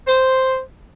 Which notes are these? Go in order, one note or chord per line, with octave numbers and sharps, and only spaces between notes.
C5